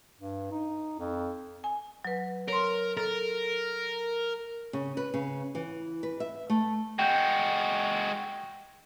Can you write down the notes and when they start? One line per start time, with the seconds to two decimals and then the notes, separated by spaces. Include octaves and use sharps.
0.18 G2
0.51 D#4
0.99 F2
1.64 G#5
2.05 F#3 B4
2.48 A#4 C#5 C6
2.97 A4 A#4
4.73 C#3
4.97 B4
5.14 C#3
5.55 E3
6.03 B4
6.20 E5
6.50 A3
6.99 G#3 F#4 G5 G6